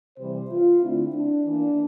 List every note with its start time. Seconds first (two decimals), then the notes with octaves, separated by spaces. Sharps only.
0.17 C3 E3 G3 C5
0.50 F4
0.81 D3 A3 C4 E4
1.14 D4
1.45 E3 A#3 D4